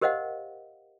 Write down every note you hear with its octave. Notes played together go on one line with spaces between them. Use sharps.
G4 A#4 C5 D#5 F5 F#5